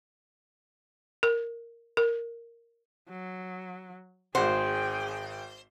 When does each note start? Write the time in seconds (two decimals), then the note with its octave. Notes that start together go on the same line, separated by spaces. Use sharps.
1.23 A#4
1.97 A#4
3.09 F#3
4.35 G#1 G#4 C5 F#5 G5